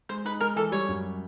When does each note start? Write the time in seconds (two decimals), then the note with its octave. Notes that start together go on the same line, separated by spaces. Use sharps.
0.09 G#3 C5
0.25 D#4 B4
0.41 G#3 A#4
0.56 E3 A4
0.72 G3 C#5
0.88 F#2